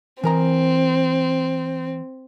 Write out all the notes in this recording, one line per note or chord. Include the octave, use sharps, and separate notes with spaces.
E3 C4 A#4 A#5